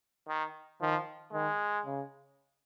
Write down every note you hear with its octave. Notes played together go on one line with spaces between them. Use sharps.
D#3
D#3 F3
D#3 G#3
C#3